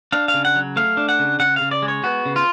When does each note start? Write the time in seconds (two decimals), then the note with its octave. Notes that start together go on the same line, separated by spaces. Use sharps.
0.12 D4 F5
0.28 F5
0.34 C#3
0.45 F#5
0.55 F#3
0.76 A3 F5
0.97 D4
1.09 F#5
1.19 C#3
1.40 C#3 F#5
1.56 C#3 F5
1.71 D5
1.82 G#3
1.88 C#5
2.04 B3 F#4
2.26 C#3
2.36 F4